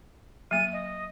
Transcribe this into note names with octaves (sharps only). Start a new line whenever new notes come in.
F#3 A#3 D#7
D#5